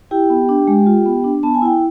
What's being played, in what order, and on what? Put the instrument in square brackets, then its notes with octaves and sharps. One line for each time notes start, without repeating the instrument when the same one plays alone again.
[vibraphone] E4 G4 G5
B3
D4
G#3
F4
B3
D4
B3 A5
G#5
E4 G5